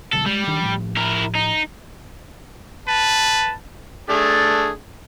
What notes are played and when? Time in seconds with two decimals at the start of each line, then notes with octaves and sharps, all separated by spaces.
0.13 B1 D3 F#3 A4
0.26 G3 G#3
0.47 D#3 D4
0.64 A2 F3
0.97 E4 A#4
1.35 D#4
2.88 B4 A5
4.09 A3 D4 G#4